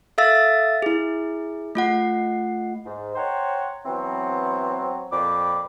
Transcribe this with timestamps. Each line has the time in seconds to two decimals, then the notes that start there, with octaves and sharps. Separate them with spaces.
0.18 A4 E5 F5 E6 A6
0.82 E4 G#4
1.75 A3 F4 F#5
2.86 G#2
3.16 C5 C#5 F#5 G5 A#5 C6
3.86 E3 F#3 B3 C4
5.12 F2 A#2 C4 B5 D6